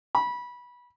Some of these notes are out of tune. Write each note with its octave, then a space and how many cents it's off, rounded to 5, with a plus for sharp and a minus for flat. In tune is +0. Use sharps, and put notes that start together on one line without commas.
B5 -20